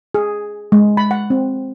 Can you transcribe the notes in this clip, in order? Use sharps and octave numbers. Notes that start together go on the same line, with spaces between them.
G#4
G#3
B5
F#5
C4